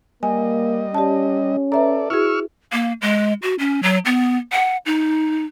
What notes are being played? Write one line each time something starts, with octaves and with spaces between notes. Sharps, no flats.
G3 A#3 D#5 G#5
C#4 G4 D5 A5
A4 B4 D5 E5 A#5
E4 F#4 G#4 C#6 E6 F6
A#3
G#3
F#4
C#4
F#3
B3
F#5
D#4